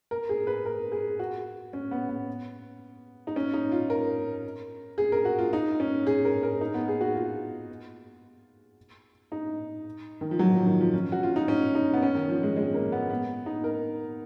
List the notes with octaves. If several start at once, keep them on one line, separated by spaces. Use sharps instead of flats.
A#4
G#4
B4
A#4
G#4
F#4
C#4
B3
B3
D#4
C#4
D#4
F4
A#4
G#4
A#4
F#4
F4
D#4
C#4
G#4
A#4
A#4
D#4
B3
G#4
F#4
F4
D#4
D#3
F3
F#3
F3
D#3
F3
C#4
F#4
F4
D#4
C#4
D#4
B3
C#4
D#3
F3
G#3
G#3
A#3
B3
B3
D#4
A#4